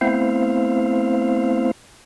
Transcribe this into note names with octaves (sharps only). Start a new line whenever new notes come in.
A3 B3 C4 E4 C5 F5